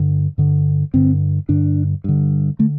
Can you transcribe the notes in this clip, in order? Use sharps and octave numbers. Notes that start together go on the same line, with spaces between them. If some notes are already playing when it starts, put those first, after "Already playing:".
Already playing: G2 D3
G2 D3
G2 D3 C4
G2 D3 D4
G2 D3
D3 A3